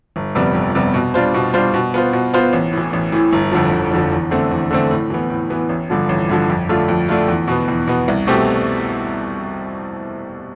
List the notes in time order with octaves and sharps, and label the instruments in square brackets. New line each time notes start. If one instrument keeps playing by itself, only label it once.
[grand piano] G1
F2 C3 G3 B3
G1
F2 C3 G3 B3
B2
G3 D4 F4 C5
B2
G3 D4 F4 C5
B2
B3 F4 C5
B2
B3 F4 C5
A1
A2 E3
A1
A2 E3
G1
F2 D3 F3
G1
F2 D3 F3
E2
D3 A3 C4
E2
D3 A3 C4
A2
E3 B3
A2
E3 B3
A1
G2 D3 F3
A1
G2 D3 F3
F2
D3 A3 D4 F4
F2
D3 A3 D4 F4
E2
B2 B3
E2
B2 B3
C2
B2 A3 C4 G4